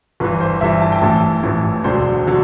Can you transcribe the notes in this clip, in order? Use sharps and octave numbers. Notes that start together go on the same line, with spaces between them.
G1 G2 E3 B4
C5
G1 G2 E3 E5
A5
G5
A1 A2 E3 A5
A1 A2 E3
E1 D2 D3 F#3 C5
D3 F#3